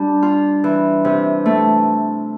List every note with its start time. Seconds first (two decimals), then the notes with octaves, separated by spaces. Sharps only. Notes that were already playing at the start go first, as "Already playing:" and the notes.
Already playing: G3 D4
0.22 F4
0.64 E3
1.05 C3
1.46 A3